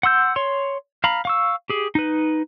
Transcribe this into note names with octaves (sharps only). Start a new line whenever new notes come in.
F#5 C6 E6 G6
C#5 C6
F5 A#5 B5
F5 C#6 E6
G4 G#4
D#4 B4